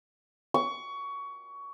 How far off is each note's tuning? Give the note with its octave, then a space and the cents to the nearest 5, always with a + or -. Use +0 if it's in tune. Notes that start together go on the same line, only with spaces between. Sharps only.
C#6 +20